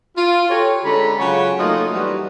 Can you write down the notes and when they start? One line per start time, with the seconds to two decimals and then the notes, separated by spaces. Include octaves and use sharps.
0.17 F4
0.50 F#4 G4 A4 C#5
0.85 D3 G#3 C#4 A4 A#5 B5
1.19 C#3 F#3 F4 C#5 F#5
1.58 F#3 A3 A#3 D#4 F4
1.94 E3 G3 F#4